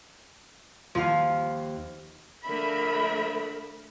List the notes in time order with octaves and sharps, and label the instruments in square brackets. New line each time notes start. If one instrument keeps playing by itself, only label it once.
[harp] D#2 F5 [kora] F3
[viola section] D3 F3 A3 A#4 E5 B5